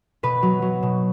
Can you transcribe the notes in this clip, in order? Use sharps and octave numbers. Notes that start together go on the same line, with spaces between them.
B2 B4
F#3
F#3
B2